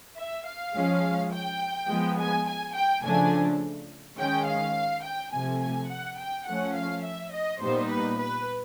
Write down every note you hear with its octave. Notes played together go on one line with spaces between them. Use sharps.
E5
F5
F3 G#3 C#4
G5
F3 G#3 B3
G#5
G#5
G5
C#3 F3 A3 D4 G#5
D#3 G#3 C#4 G5
F5
G5
C3 F3 A3 G#5
G#5
F#5
G5
F3 A3 C#4 F#5
F5
E5
D#5
A#2 G3 B3 D#4 C5
B4
B4